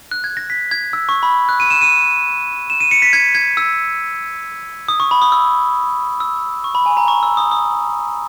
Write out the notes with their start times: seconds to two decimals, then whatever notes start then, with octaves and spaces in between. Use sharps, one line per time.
0.11 F#6
0.24 G#6
0.37 A#6
0.50 B6
0.71 G#6
0.93 E6
1.09 C#6
1.23 B5
1.49 F#6
1.60 D#7
1.70 E7
1.81 D#7
2.70 E7
2.80 D#7
2.91 C#7
3.02 B6
3.13 G#6
3.35 G#6
3.57 E6
4.88 D#6
5.00 C#6
5.11 B5
5.22 D#6
5.32 E6
6.20 E6
6.64 C#6
6.75 B5
6.86 G#5
6.97 A#5
7.08 C#6
7.23 E6
7.37 D#6
7.51 D#6